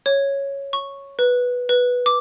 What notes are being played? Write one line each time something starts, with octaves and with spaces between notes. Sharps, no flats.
C#5
C#6
B4
B4
D6